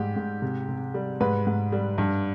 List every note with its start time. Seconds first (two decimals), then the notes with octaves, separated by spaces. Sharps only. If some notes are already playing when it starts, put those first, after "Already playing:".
Already playing: G#2 G3 G4
0.16 G#2
0.42 C3
0.69 C3
0.94 G3
1.20 G#2 B4
1.47 G#2
1.72 G3
1.98 G2